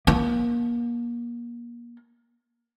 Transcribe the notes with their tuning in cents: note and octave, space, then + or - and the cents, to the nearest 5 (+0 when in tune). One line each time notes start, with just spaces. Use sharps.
A#3 +30